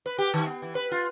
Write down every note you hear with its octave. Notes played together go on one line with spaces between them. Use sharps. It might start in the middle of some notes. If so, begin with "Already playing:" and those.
B4
G4
D#3
B3
E3
B4
F4